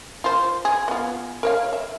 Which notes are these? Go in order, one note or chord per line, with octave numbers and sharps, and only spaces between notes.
F4 C5
G#4
B3 F4
A#4 C#5 F5
E5